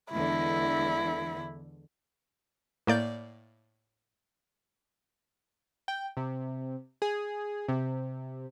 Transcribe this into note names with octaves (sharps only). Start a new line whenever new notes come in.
E2 D3 G#3 E4
A2 A#3 D5 G6
G5
C3
G#4
C3